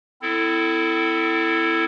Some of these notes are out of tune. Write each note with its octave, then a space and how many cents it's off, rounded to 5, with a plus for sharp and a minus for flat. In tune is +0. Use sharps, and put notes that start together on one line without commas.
C4 -35 E4 +5 A4 +15